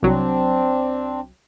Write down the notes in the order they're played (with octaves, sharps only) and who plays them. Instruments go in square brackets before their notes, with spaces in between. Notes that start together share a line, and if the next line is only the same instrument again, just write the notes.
[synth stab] C2 F#3 [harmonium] C4 D4